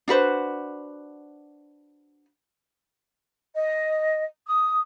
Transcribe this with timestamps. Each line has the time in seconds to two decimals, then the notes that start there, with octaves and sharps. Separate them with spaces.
0.08 D4 F#4 B4 C5
3.56 D#5
4.46 D#6